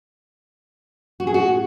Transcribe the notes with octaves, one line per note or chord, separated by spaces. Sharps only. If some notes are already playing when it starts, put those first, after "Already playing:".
F#4
G#4
F#4